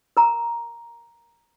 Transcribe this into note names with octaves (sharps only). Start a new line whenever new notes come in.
A#4 A#5